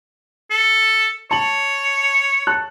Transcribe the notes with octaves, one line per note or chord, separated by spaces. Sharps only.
A4
C#5 A5 F#7
A5 F#6